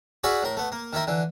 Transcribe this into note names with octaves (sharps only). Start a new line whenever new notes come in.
F#4 G#4 B4 D5 E5 F5
A2 A#4
A3 B3
A#3
D#3 D#4 E4 A#4
D3 E3